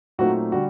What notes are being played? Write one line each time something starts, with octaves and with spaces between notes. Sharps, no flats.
A#2 F#3 A3 C4 D#4 F#4
D3 G3 F#4